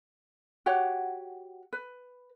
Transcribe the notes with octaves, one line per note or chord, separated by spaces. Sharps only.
F#4 G4 C#5 F#5
B4